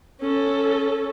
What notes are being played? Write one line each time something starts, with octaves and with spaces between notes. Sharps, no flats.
C#4 A4